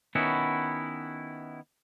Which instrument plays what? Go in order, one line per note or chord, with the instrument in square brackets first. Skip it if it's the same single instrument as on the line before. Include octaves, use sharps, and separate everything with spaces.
[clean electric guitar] D#3 B3 C#4 E4 F#4